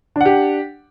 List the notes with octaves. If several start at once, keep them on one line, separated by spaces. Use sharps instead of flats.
D4 G4 F#5